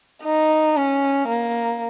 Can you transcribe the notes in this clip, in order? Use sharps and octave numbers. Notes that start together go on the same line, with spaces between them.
D#4
C#4
A#3